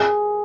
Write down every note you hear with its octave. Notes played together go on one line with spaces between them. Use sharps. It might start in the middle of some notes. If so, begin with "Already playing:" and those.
Already playing: G#4